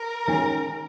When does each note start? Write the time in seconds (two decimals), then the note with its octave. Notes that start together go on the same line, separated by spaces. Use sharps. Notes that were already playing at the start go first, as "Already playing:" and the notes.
Already playing: A#4
0.28 D#3 G#3 C#4 G#4